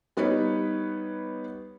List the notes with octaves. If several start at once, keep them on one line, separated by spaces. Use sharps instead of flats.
G3 B3 D#4 B4 C#5